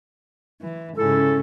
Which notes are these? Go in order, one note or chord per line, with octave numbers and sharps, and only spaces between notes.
E3
G#2 C#3 C#4 E4 A4